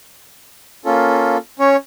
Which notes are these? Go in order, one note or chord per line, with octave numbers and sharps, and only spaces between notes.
A#3 C#4 F4 A4
C#4 C#5